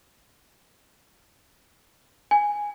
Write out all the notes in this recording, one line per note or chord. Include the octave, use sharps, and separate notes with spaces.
G#5